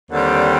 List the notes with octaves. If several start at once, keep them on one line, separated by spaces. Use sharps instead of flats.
D#2 D3 G3 C4